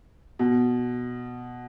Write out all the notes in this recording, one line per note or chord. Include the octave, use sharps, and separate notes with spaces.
B2